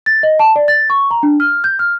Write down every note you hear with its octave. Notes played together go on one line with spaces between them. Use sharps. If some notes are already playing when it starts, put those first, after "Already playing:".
A6
D#5
A5
D5
A6
C#6
A#5
D4
F6
G6
F6